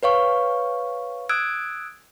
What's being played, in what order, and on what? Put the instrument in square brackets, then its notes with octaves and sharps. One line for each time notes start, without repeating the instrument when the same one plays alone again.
[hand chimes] B4 C#5 F5 C#6
D#6 E6 F#6 G#6 D7